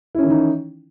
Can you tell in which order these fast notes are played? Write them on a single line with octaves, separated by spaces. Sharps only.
E4 C#4 D#3 E3 D#4